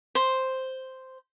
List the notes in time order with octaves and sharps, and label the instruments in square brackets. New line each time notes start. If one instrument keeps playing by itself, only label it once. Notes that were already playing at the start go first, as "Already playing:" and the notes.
[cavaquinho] C5